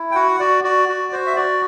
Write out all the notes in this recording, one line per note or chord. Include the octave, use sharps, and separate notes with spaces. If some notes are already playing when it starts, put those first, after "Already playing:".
Already playing: E4
G5
F#4 F#5
F#4 D5
F#4 D5
F#4
F#4 C5
E5
F#4 D5